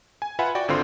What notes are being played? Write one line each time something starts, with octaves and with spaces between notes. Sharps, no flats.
G#5
F4 B4 E5 F#5 G#5 B5
F#4 D5 G5
G#1 D3 C4 F4 C5 C6